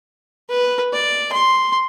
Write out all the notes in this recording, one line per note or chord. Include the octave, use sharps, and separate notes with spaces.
B4
D5
C6